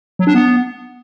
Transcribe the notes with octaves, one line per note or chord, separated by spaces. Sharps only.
F#3
D4
B3